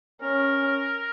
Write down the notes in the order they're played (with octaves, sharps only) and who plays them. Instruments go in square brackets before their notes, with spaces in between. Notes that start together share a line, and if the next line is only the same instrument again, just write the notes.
[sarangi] C#4 [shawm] A#4